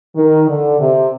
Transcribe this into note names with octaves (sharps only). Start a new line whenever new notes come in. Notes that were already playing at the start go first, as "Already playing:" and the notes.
D#3
D3
C3